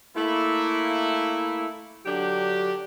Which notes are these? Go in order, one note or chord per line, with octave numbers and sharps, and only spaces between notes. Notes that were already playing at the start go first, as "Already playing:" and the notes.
A3 A#3 E4
D3 F#3 D4 G4